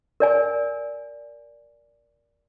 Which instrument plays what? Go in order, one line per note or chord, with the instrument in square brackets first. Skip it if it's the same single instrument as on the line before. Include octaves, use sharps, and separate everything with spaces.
[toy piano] A#4 D5 G#5